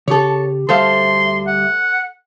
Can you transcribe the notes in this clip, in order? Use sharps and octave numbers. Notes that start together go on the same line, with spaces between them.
C#3 G4 A4 C#5
D2 G3 A4 C5 E5 F5 C6
F#5